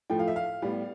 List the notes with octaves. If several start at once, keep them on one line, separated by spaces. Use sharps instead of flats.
A2 F3 A3 G5
F5
E5
F5
A2 G3 B3